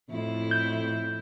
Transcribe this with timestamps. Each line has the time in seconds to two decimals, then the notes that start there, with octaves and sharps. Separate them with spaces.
0.10 F2 A2 E4
0.51 G6